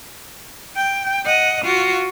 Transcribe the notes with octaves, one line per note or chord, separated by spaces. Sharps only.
G5
D#5 F#5
F4 F#4